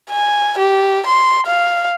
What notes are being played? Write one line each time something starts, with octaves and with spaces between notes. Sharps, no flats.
G#5
G4
C6
F5